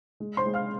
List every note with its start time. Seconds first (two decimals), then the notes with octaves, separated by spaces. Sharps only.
0.20 G#3
0.37 C5 C6
0.46 G#3
0.54 F5 F6